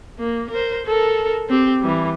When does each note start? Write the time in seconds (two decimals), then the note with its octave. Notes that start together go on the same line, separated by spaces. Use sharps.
0.19 A#3
0.51 A#4 C5
0.86 A4 A#4
1.49 C4 G4
1.82 E3 G3